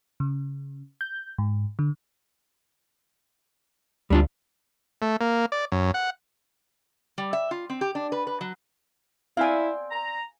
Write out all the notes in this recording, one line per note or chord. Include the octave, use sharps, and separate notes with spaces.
C#3
G6
G#2
D3
D2 G3 D4 F4
A3
A#3
D5
F#2
F#5
G3
E5
F4
C4
G4
D4
B4
B4
F#3
C4 E4 D5 F5 G#5
A#5